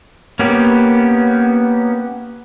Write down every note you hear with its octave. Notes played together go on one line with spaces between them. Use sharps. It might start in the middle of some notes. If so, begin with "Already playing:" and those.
A#3 B3 C#4 G4